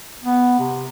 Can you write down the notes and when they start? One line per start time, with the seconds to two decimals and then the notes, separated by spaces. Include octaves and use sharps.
0.24 B3
0.59 C3